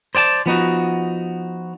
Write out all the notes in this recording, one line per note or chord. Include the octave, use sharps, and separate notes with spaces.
C5 D5 G5 A5
F3 B3 D#4 F#4